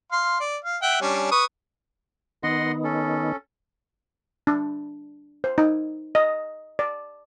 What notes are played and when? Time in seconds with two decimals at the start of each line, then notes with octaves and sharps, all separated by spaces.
0.12 F5 C6
0.40 D5
0.64 F5
0.82 E5 F#5 G5
1.01 G3 C#4 D4
1.31 B4 C#6 D#6
2.43 D#3 B3 D#4 D#5 F#5 C6
2.84 C#4 A4
4.47 D4
5.44 C5
5.58 D#4
6.15 D#5
6.79 D5